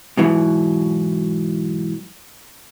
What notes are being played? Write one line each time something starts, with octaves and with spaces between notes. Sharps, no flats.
G#2 B2 E3 F#3